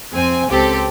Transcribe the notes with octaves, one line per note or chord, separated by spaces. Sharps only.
F2 C4 G#5
C#2 C4 G4 A4